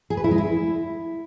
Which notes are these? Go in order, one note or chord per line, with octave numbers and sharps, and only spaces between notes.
G#4
B4
E4
G#3
E4